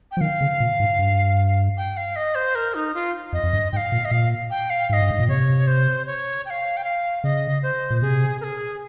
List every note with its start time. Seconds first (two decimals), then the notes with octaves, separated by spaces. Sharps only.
0.11 G5
0.17 F3
0.21 D#3 F5
0.41 C#3
0.60 A#2
0.80 G#2
0.99 G2
1.77 G5
1.97 F5
2.16 D#5
2.35 C5
2.55 A#4
2.75 D#4
2.94 F4
3.33 F2 D#5
3.43 F2
3.53 G2
3.73 G#2 G5
3.77 F5
3.92 A#2
4.05 D#5
4.11 A#2 F5
4.50 G5
4.70 F5
4.89 G#2 F5
4.93 D#5
5.02 G2
5.11 G#2
5.20 A#2
5.29 C3 C#5
5.67 C5
6.06 C#5
6.45 G5
6.50 F5
6.77 G5
6.84 F5
7.24 C#3 D#5
7.63 C5
7.90 A#2
8.02 C3 G#4
8.41 A#4
8.44 G#4